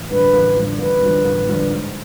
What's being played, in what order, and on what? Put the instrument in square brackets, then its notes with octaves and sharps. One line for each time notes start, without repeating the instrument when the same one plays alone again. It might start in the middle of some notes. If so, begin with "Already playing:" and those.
Already playing: [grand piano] A1
[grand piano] G2 D3 F3 [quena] B4
[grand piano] A1
G2 D3 F3
[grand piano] A1 [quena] B4
[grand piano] G2 D3 F3
A1
G2 D3 F3
G#2